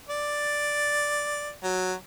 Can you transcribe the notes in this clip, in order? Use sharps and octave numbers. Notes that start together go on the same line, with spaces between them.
D5
F#3